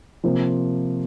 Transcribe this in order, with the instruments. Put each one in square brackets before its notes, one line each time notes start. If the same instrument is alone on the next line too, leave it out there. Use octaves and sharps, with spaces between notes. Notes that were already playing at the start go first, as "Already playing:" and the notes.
[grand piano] C3 F3 A#3 F4 C5